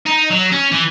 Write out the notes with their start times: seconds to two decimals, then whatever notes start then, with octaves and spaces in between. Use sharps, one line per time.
0.06 D#4
0.30 F#3
0.51 C#4
0.72 E3